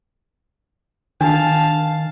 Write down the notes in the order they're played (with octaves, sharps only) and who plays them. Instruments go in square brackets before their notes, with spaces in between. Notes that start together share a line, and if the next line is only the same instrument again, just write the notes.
[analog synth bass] D#3 [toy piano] D4 [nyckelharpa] F5 A5